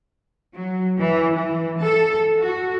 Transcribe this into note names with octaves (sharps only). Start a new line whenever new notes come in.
F#3
E3
E3
A4
F#4